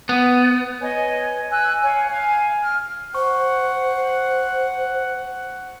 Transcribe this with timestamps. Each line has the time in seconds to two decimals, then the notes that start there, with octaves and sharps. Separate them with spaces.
0.09 B3
0.80 B4 C#5 D#5 G#5
1.51 G#5 E6 F#6
1.83 C#5 F5 G#5
2.08 F5 G#5
2.61 F6
3.15 C5 F#5 C#6